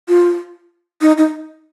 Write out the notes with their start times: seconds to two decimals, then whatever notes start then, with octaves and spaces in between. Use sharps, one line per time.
0.09 F4
1.01 D#4
1.18 D#4